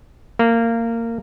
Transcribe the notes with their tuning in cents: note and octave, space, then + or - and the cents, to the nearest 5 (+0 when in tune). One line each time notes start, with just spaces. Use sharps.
A#3 -20